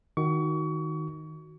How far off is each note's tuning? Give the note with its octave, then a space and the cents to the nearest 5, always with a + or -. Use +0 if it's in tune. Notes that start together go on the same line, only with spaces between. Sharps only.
D#3 +0 F#4 +0 C#6 +30